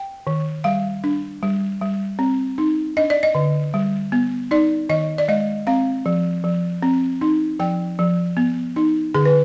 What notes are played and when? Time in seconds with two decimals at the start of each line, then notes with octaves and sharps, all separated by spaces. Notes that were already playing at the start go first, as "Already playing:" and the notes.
Already playing: G5
0.27 D#3
0.64 G3 F5
1.04 D4
1.43 G3
1.81 G3
2.19 C4
2.58 D#4
2.97 D4 D#5
3.10 D5
3.23 D#5
3.35 D3
3.74 G3
4.12 B3
4.51 D#4 D5
4.89 D#3 D#5
5.18 D5
5.28 G#3 D#5
5.67 C4 F5
6.06 F3
6.44 F3
6.82 C4
7.21 D#4
7.60 F3 G5
7.99 F3
8.37 B3
8.76 D#4
9.15 D3 G#4
9.25 B4